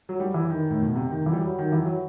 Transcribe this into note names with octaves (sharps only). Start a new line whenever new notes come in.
F#3
G3
E3
D#3
A2
B2
C3
D#3
E3
G3
F#3
D#3
E3
F#3